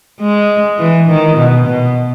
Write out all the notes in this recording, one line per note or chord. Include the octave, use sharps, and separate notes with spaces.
G#3
E3
D#3
B2
B2